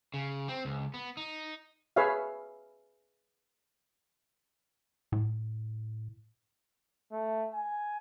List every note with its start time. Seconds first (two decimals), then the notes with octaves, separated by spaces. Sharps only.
0.14 C#3
0.49 C4
0.65 C#2
0.94 B3
1.17 D#4
1.96 G#4 B4 C#5 E5 F5
5.12 A2
7.12 A3
7.54 G#5